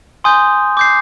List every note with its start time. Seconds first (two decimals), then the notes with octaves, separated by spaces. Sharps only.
0.24 G#5 C6 D#6 G6
0.77 D6 G6 C7